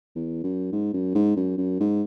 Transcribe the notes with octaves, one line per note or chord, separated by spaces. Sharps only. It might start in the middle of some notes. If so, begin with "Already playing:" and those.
E2
F#2
G#2
F#2
G#2
F#2
F#2
G#2